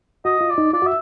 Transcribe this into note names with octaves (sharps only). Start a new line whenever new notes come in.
F#4 D#5
F4
D5
D#4
F4 D5
F#4
E5